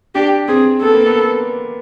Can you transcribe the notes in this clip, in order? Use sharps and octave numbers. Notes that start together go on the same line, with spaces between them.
D4 G4
C4 G#4
B3 A4
A#3
B3